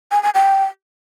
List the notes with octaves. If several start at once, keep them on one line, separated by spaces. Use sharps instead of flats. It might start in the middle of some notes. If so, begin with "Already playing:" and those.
G#5
G#5
G5